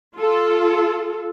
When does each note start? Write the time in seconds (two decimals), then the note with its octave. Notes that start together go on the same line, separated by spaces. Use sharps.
0.16 F4 A4